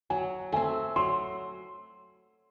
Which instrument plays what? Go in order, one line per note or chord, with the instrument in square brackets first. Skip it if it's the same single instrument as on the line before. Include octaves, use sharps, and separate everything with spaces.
[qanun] F#3 [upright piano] G#5
[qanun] A3 C4 [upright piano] G#5
[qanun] F#3 [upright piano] C6